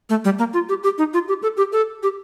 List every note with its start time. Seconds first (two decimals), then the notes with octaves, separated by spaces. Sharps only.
0.10 A3
0.25 G3
0.39 A#3
0.53 F4
0.69 G4
0.83 G4
0.98 D#4
1.14 F4
1.28 G4
1.43 A4
1.57 G4
1.73 A4
2.03 G4